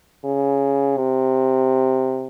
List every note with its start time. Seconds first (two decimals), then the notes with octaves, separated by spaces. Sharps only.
0.24 C#3
0.97 C3